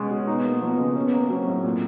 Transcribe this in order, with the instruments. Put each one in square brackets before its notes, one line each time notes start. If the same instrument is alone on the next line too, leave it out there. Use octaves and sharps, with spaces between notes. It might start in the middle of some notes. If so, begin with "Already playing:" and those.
Already playing: [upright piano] B2 G#3 C#4
B2
[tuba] B3 [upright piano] D#4
[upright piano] A#3
[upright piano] F3 [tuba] B3
[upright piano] C#3
[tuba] B3 [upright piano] C#4
[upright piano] A#3
[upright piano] F#3 [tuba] C4
[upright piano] A2
A#2